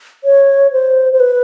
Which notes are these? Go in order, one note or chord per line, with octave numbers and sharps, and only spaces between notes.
C#5
C5
C5
B4